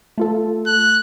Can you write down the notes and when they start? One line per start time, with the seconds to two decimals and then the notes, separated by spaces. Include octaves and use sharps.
0.18 A3 F4 A4
0.67 F#6